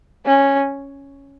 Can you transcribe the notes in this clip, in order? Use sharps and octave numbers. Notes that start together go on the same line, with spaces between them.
C#4